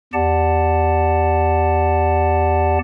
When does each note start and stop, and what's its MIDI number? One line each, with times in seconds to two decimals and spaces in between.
0.13 2.78 40
0.13 2.78 67
0.13 2.78 74
0.13 2.78 78
0.13 2.78 81